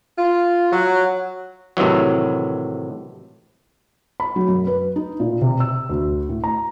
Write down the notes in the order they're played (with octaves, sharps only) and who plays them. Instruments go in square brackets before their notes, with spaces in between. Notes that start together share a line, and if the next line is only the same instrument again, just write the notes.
[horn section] F4
F#3
[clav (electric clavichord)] A2 C3 D#3 E3 F#3
[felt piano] B5
F#3
F#2
B4
D#4
A#2
C3
E6
D2
A2
A#5